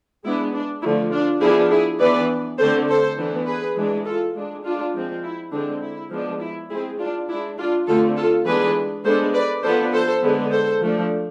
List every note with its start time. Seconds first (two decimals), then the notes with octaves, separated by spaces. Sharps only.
0.24 G#3 B3 D4 E4
0.53 D4
0.82 D3 F3 A3 E4
1.12 D4 F4
1.41 F3 B3 D4 E4 G#4
1.71 E4 G#4
2.00 E3 B3 D4 B4 D5
2.59 D3 A3 C4 A4 C5
2.88 A4 C5
3.17 E3 B3 D4
3.46 G#4 B4
3.76 E3 G#3 D4
4.06 F4 A4
4.35 G#3 D4
4.64 D4 F4
4.93 F3 G#3 C4
5.23 E4
5.52 D3 G#3 C4 D4
5.82 E4
6.11 F3 G#3 B3 D4
6.41 E4
6.70 G#3 C4 E4 G#4
6.99 D4 F4
7.28 G#3 D4 E4
7.58 D4 F4
7.87 D3 A3 C4 F4 A4
8.17 F4 A4
8.46 E3 G#3 B3 D4 G#4 B4
9.04 G#3 B3 D4 A4 C5
9.34 B4 D5
9.63 F3 B3 D4 A4 C5
9.93 A4 C5
10.23 D3 G#3 B3
10.51 A4 C5
10.81 F3 A3 D4